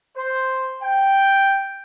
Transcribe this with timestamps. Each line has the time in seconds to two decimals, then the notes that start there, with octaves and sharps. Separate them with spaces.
0.15 C5
0.82 G5